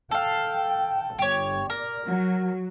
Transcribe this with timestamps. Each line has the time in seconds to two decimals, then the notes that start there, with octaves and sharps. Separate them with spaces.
0.11 A4 F5 G5
1.19 G1 G4 C#5
1.70 A#4 D5
2.06 F#3 F#4